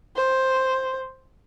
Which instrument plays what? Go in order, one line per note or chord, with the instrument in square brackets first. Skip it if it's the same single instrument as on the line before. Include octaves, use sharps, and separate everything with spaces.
[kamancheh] C5